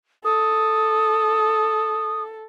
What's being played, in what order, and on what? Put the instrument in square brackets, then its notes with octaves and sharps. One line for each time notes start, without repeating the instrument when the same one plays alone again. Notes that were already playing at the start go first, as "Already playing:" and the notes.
[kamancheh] A4 [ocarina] D#6